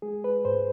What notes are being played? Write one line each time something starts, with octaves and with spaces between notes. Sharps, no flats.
G#3 G#4
B4
G#2 C5